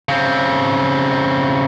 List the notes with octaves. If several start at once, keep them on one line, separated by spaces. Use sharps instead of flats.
C#3 C4